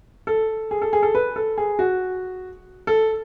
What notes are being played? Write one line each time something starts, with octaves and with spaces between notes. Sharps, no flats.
A4
G#4
A4
G#4
A4
B4
A4
G#4
F#4
A4